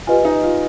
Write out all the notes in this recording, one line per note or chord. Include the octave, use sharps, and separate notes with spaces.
F4 G4 B4 D#5 G#5
D#4
F4